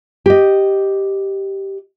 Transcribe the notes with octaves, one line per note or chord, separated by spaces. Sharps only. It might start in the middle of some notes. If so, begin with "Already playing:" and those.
G4 D#5